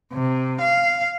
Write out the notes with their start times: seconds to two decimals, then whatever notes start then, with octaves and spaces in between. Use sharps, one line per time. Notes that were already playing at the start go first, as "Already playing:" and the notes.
0.13 C3
0.61 F5